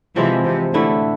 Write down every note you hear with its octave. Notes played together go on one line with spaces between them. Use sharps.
C3 E3 F3 G#3 C4 E4
C3
A2 D3 A3 E4